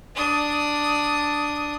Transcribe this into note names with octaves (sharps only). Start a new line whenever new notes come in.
D4 D#6